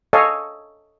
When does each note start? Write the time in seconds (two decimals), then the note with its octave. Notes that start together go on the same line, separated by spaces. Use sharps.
0.13 A4 C#5 D#5 F5 G#5